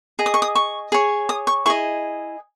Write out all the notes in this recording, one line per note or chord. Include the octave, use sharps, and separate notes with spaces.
G#4 D#5
D#6
C#6
D#6
C#6
G#4 C#5
D#6
C#6
E4 G#4 D#5 C#6